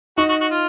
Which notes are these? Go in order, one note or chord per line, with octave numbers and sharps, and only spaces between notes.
D#4 F#4
F#4
F#4
F4